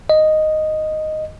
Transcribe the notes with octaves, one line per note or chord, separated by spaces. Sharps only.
D#5